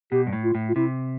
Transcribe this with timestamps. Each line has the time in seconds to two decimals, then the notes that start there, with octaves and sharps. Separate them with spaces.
0.12 B2 G4
0.27 G2
0.33 A2
0.44 F4
0.55 A2
0.69 F4
0.76 C3 E4